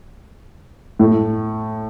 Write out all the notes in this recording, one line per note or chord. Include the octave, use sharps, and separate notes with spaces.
A2